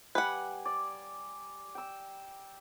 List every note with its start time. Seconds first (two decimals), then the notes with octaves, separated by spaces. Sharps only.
0.15 G3 B4 F#5 G#5
0.65 D5
1.75 G5 E6